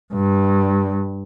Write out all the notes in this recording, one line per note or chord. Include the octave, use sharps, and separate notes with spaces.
G2